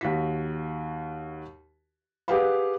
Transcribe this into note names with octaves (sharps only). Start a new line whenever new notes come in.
D#2 F#4 B6
G4 G#4 B4 F5 F#5 B5